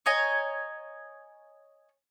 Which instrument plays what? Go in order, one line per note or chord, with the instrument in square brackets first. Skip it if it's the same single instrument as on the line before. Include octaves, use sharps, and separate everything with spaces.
[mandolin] C#5 D#5 G#5 A#5